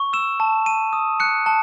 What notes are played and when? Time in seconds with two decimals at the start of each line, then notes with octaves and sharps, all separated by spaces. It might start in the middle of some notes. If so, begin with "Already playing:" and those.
Already playing: C#6
0.13 E6 E7
0.40 A5
0.66 A5 D#7
0.93 D#6
1.20 F#6 C#7
1.46 A5